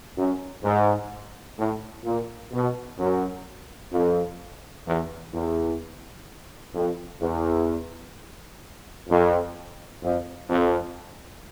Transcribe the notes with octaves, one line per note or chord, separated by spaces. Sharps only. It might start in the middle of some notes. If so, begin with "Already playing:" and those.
F#2
G#2
A2
A#2
B2
F#2
F2
E2
E2
F2
E2
F2
F2
F2